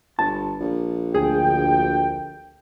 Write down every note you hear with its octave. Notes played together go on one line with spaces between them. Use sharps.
G1 A5
A#1
D2 G#4 G5